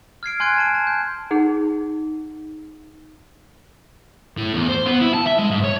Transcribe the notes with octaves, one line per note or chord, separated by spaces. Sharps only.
F6 G#6 C7 D7
G#5 C6 F#6 G#6 D7
G#5 A5 D7
A5
G6
D#4 G#4 F#5
A2
E2
C5
B3
E4
A5
E5
G#3
G#2
C#5